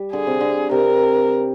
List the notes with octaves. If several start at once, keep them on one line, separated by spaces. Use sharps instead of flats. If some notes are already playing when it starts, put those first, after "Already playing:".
Already playing: G3
D3 G#4
C3
D3
C3 A#4